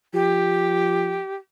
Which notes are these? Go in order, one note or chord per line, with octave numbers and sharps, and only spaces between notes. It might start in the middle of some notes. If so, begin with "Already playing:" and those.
F3 G4